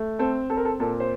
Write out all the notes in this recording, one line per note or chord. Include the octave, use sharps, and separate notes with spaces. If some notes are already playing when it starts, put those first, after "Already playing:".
Already playing: A3
C4 A4
C4 A4
A#4
A4
A#2 A4
C5